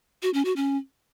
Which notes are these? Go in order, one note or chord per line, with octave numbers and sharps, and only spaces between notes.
F#4
C#4
F#4
C#4